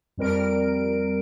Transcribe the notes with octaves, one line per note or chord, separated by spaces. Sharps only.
F2 G3 A#4 D7